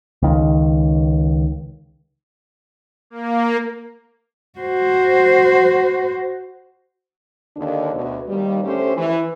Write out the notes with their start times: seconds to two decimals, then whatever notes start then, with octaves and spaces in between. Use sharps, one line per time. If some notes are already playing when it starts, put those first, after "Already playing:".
0.22 C#2 D#3
3.10 A#3
4.60 F#4 C5
7.57 D#2 D3 D4
7.94 D2 B2 F#4
8.29 D#2 G3
8.64 D3 A3 C#4 G4 C5
8.97 E3